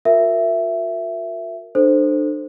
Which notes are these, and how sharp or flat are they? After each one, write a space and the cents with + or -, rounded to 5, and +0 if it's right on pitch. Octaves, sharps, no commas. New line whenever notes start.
F#4 -40 A#4 -10 E5 +10
D4 +35 A4 +0 C5 +0